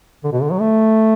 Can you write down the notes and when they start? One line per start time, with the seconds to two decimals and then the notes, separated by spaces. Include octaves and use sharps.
0.24 D3
0.32 B2
0.42 D3
0.51 F#3
0.60 A3